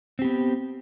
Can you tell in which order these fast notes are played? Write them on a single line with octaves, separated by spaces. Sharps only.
C4 G4 B3